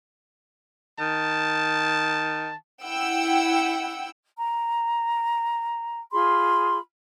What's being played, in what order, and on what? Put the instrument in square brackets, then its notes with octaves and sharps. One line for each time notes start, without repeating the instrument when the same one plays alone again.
[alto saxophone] D#3 [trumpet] A5
[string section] E4 F#5 G5 E6
[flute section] A#5
F4 G#4 B5 C6